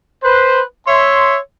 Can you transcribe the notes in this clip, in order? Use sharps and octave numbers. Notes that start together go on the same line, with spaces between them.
B4 C5
C#5 E5 C6